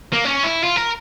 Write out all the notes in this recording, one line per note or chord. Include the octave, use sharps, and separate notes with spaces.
A#3
C#4
E4
F4
A#4